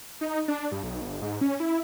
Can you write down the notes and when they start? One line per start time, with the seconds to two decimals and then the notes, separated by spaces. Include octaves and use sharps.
0.21 D#4
0.48 D4
0.72 G2
0.83 B1
1.01 G1
1.22 G#2
1.41 C#4
1.60 E4